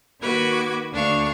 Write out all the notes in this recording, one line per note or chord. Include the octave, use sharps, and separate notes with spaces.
D#3 A#3 F#4 B4 D6 G#6
D2 D4 F5 C#6